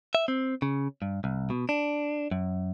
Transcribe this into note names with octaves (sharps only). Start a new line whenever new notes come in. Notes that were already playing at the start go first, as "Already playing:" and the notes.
E5
C4
C#3
G2
C2
B2
D4
F#2